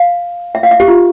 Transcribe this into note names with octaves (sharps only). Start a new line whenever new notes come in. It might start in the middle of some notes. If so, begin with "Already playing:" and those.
Already playing: F5
E5
F5
E5
G4
F4